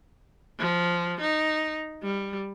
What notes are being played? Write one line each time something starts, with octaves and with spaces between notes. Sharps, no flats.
F3
D#4
G3